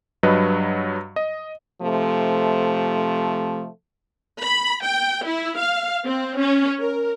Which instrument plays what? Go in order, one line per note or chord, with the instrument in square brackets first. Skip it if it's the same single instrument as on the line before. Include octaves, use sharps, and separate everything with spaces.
[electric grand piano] G2 F#3 B4 D#5
D#5
[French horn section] C3 F3 A3
[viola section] B5
G5
E4
F5
C4
C#4
A#4